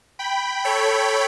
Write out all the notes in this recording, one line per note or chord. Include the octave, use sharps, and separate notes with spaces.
G5 B5
A4 C#5